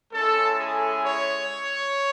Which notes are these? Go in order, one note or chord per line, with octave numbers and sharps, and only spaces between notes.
G#3 C#4 E4 A4
G#4
C#5